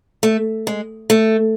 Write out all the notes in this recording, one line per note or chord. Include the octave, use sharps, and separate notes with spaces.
A3
G#3
A3